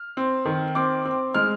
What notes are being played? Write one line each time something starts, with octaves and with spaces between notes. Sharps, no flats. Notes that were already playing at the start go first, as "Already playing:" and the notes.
Already playing: F6
C4
D#3
C4 D6
C4
G#3 F6